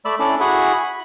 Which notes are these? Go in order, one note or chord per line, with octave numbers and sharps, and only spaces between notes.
A3 D5 B5 E6
C#4 D4 E4 A4 D5
E4 F#4 G#4 F#5 G#5 B5
B5